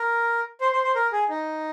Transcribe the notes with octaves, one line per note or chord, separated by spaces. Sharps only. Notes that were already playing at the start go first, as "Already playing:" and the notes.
Already playing: A#4
C5
C5
C5
A#4
G#4
D#4